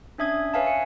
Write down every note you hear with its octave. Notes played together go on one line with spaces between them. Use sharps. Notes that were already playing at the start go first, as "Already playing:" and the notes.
C#4 D4 E5 D#6 G#6
B4 C#5 E5 F5 G#5 A5
C#7